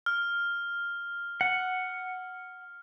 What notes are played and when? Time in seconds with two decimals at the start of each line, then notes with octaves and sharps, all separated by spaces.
0.06 F6
1.41 F#5